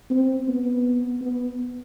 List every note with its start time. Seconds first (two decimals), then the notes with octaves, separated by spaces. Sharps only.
0.10 C4
0.48 B3
1.21 B3